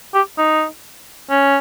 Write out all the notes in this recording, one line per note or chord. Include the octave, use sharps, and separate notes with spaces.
G4
D#4
C#4